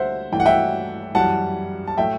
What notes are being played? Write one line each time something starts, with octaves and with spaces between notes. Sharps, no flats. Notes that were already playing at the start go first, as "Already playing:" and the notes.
Already playing: D2 D3 G3 C5 E5 F#5
G2 E3 A3 G5
F#5
E5 G5
F#2 E3 G3 F#5 A5
A5
A2 F#3 A3 E5 G5